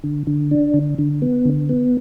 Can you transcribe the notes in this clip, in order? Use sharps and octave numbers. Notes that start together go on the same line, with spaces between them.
D3
D3
D4
D3
D3
B3
D3
B3